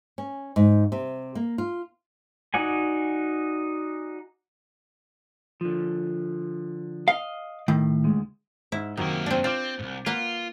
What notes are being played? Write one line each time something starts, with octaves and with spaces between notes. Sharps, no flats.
C#4
G#2
C3
A#3
F4
D#4 F#4 D5 F#5 G#5
D3 F3
D#5 F5
A2 D#3
D2 G#3
G#2 E4
F#2 C3 D#3 F#3 A#3
C4 D4
C4 F4 D6 G6 A6
C2 G#2
A#3 F4 B4 F#5